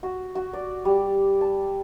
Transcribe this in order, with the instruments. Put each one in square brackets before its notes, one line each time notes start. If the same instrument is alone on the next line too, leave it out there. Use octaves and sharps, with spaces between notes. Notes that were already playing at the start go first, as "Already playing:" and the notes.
[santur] F#4
F#4
D5
G3
A5